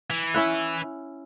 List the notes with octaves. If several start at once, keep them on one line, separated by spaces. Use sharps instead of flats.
E3
C#4 E4 F#5